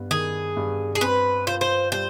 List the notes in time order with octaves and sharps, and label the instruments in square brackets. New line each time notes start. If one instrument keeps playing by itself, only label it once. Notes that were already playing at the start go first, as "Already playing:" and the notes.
Already playing: [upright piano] G2 B3
[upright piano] D#3 [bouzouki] G#4
[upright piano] G2
[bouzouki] G#4
[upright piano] C4 [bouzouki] B4
[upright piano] F4 [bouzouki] C5
[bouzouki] C5
[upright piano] G3 [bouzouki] C5